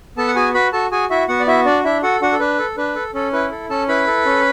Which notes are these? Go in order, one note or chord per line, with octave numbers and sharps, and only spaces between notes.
B3 A4 A5
F#5
F#4 G#4 G#5
F#4 B4 B5
F#4 A4 A5
F#4 G#4 G#5
E4 F#4 E5
B3 F#4 F#5
D5
E4 F#4 E5
D4 D5
D4 E4 E5
F#4 A4 F#5
D4 F#4 F#5
A4
D4 B4
A4
D4 B4
A4
C#4 A4
E4 B4
A4
C#4 A4 A5
E4 B4 B5
A4
C#4